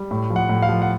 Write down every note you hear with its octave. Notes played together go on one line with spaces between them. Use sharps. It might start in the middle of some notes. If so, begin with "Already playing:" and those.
Already playing: G3
A2
F3
F#5
A2
F5
F3
F#5